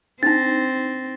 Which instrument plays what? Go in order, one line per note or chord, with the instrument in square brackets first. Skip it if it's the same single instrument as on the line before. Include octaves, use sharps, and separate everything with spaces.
[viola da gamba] C4 [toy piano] D4 D#4 [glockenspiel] A6 A#6